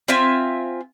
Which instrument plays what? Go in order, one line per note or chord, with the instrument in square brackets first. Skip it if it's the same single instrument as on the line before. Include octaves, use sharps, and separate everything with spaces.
[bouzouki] C4 F4 E5 G#5